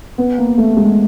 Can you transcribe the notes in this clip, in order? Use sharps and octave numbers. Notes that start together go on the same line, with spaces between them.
B3
A#3
A3
G#3